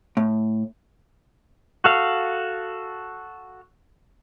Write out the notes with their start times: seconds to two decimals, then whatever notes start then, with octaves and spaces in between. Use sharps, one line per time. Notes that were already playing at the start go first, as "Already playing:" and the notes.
0.17 A2
1.84 F#4 A4 F5